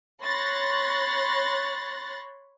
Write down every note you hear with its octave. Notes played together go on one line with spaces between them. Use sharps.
C#5 B5 C6 F#6 A6 A#6